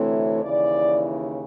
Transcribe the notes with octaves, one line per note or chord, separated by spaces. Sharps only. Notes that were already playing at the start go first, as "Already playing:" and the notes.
Already playing: D2 C3 E3 A3 C4 C#5
D#2 C#3 E3 D5